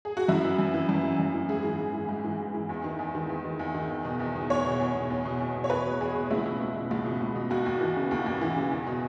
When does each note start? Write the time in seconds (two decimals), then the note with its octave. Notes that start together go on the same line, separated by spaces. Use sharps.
0.05 G#4
0.17 F#4
0.28 F#2 E4
0.44 E3
0.59 F#2
0.74 E3
0.89 F#2
1.03 E3
1.19 F#2
1.34 E3
1.49 G#2 G#4
1.64 E3
1.79 G#2
1.94 E3
2.09 G#2
2.24 E3
2.39 G#2
2.54 E3
2.69 E2
2.84 D#3
2.99 E2
3.15 D#3
3.29 E2
3.45 D#3
3.59 E2
3.74 D#3
3.90 E2
4.05 B2
4.20 E2
4.35 B2
4.50 E2 C#5
4.65 B2
4.80 E2
4.95 B2
5.10 E2
5.25 B2
5.40 E2
5.55 B2
5.64 C#5
5.70 E2 B4
5.85 B2
6.01 E2 G#4
6.15 B2
6.31 C#2 E4
6.45 B2
6.60 C#2
6.76 B2
6.91 C#2
7.06 B2
7.20 C#2
7.35 B2
7.50 D#2 F#4
7.66 D#2
7.81 E3
7.96 C#3
8.11 D#2
8.26 D#2
8.41 E3
8.56 C#3
8.71 E2
8.87 B2